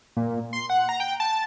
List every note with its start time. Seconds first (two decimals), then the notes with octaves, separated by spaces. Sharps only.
0.17 A#2
0.53 C6
0.70 F#5
0.89 A#5
1.00 G5
1.20 A5